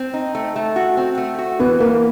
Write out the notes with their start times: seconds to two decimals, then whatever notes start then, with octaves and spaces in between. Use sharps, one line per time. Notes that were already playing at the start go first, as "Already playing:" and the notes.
Already playing: C4
0.14 D#4
0.35 A3
0.56 A3
0.76 F#4
0.97 C4
1.18 A3
1.38 F#4
1.60 E3 B3
1.80 E3 A#3